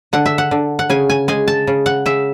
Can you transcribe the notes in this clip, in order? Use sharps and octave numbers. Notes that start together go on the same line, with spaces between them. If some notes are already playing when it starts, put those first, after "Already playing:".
D3 F#5
E5
F#5
D3
F#5
C#3 G#5
G#5
G#3 G#5
A5
C#3
F#5
C#3 E5